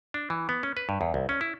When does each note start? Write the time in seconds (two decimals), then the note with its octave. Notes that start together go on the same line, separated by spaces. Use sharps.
0.14 D4
0.30 E3
0.49 B3
0.63 C#4
0.77 B4
0.89 G2
1.01 E2
1.14 C2
1.29 C#4
1.41 E4